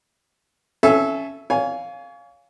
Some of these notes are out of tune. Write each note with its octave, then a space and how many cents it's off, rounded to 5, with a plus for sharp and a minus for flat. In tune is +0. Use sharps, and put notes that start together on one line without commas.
C#4 +0 A4 -20 E5 +10
C#5 +35 F5 +5 G#5 +0